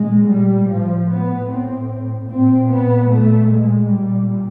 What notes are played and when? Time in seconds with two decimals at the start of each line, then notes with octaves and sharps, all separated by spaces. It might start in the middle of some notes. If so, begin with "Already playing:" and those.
Already playing: A#2 G#3
0.28 G3
0.68 A2 F3
1.09 B3
1.50 C4
2.29 A#2 C4
2.70 B3
3.10 A3
3.50 G#3
3.91 A#2 G3